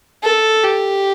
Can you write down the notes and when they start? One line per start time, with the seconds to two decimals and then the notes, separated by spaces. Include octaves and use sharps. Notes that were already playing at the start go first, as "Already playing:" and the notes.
0.23 A4
0.64 G4